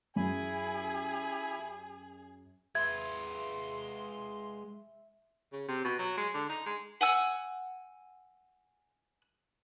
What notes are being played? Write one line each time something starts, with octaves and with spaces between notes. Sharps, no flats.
F#2 E4 G#4 G#5 B5
G#3 B4 E5 C6 G#6
C#3
C3
B2
F#3
G#3
D3
D#4
G#3
F#5 G#5 E6